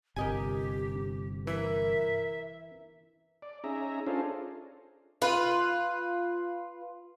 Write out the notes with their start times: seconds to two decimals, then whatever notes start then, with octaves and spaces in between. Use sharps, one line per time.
0.16 G1 C3 G4 A#4 D#5 G#5
1.47 E3 A#4 E5
3.42 D5
3.64 C#4 D#4 G#4 E5 A#5
4.06 C#4 D4 F4 G#4 A4 C5
5.22 F4 B4